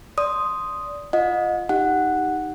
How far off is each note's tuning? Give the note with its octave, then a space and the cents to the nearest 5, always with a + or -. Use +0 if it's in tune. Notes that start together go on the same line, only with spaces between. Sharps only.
D5 -15 C6 +0 D#6 +0
F4 +0 D#5 +0 F#5 -40
D#4 +0 G4 +0 F#5 +0